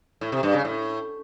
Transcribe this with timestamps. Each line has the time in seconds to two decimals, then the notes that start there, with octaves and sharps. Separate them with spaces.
0.21 A2
0.32 C3
0.43 G2
0.54 C#3
0.65 A2